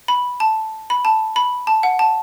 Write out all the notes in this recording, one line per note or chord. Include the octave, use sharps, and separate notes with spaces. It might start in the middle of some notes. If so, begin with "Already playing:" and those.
B5
A5
B5
A5
B5
A5
F#5
A5